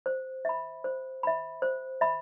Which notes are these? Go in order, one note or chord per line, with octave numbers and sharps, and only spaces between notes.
C5
E5 B5
C5
E5 B5
C5
E5 B5